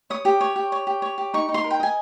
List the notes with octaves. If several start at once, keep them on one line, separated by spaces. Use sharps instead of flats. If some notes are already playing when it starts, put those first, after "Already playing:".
C#5 D#6
G4
C#5
G4
C#5
G4
C#5
G4
D#4 C#6
D#4
C6
A#4
G5
D#5 G#5